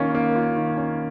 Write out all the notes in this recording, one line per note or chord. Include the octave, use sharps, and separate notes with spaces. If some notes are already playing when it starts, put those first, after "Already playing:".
Already playing: D#3 A#3 C#4 F4
A#3
F4
D#3
C#4